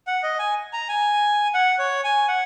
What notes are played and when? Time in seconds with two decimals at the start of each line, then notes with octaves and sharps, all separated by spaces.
0.07 F#5
0.23 D#5
0.39 G#5
0.73 A#5
0.88 G#5
1.54 F#5
1.79 C#5
2.04 G#5
2.28 F#5